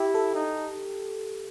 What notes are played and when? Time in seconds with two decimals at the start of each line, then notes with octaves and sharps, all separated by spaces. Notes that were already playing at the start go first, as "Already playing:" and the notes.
Already playing: E4 G4
0.15 A4
0.35 D#4